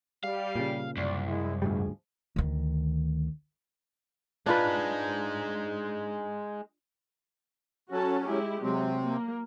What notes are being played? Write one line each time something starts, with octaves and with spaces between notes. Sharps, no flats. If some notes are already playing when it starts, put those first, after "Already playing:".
G3 F5
A#2 C#3
C2 F#2 D5
G#3 E4
D2 G#2 B2 F3 G3 G#4
D2 D#3
G#3 D4 D#4 F4 B4
F#3 C#4 F#4 A4 A5
G#3 E4 G4
C3 F#3 G#3 C4
A#3